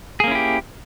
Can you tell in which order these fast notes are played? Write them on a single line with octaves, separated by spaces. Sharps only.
G#4 A#3 C#4 E4 G4